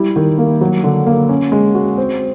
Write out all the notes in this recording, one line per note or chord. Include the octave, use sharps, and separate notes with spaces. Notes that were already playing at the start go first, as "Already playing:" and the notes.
Already playing: G3 E4
D#3
A#3
F#3
D3
A#3
C#4
G#3
F#4
C4